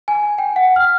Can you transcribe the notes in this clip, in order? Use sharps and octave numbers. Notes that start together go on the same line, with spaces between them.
G#5
G5
F#5
F6